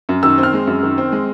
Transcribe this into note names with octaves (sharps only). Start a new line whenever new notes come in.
F#2
D#3 E6
C4
F6
G#3
F#2
D#3
C4
G#3